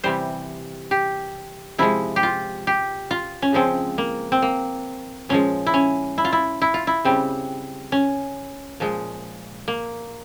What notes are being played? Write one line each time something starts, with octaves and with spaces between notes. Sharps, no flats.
C3 E3 G3 C5
G4
C3 F3 G#3 E4
G4
F4
G4
F4
C#4
C#3 F3 G#3 C4
A#3
C4
A#3
A#2 F3 G#3 C#4
E4
C#4
E4
F4
E4
E4
F4
E4
C#3 G3 C4
C#4
A#2 F3 G#3
A#3